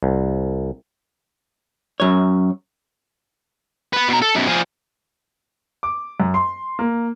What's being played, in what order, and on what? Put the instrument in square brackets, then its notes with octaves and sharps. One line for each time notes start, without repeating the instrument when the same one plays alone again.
[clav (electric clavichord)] C2
[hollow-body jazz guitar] F#2 C#5
[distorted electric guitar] B3 B4
B2 A#5
A4
F#2 B2
F3 G#4
[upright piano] D6
F#2
C6
A#3